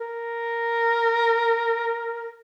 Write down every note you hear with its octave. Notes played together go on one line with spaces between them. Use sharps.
A#4